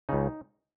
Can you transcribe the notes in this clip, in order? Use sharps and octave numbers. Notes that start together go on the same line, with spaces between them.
C#2 C#3 D#4